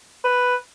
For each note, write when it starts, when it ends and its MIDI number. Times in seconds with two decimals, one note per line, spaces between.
0.24 0.56 71